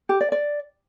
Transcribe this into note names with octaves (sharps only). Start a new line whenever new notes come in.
G4
D5
D5